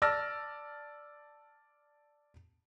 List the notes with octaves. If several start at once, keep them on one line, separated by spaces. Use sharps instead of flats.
D5 A5 E6 F6 A#6